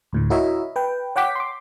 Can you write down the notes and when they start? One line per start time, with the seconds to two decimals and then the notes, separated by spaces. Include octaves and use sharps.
0.13 D2 A2 D3
0.30 E4 F#4 A#4 C#5 D#5 E5
0.76 B4 G5
1.16 C#5 F#5 G5 D6 B6
1.36 C6 D6